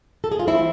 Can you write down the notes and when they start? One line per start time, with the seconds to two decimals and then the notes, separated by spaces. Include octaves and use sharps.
0.24 A4
0.32 G#4
0.39 F4
0.47 E3 C4 E4